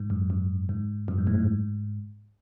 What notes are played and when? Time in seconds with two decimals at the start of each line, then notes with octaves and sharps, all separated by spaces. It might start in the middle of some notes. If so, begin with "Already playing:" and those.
Already playing: G#2
0.10 F#2
0.30 F#2
0.69 G#2
1.08 F#2
1.18 G#2
1.27 A2
1.38 G#2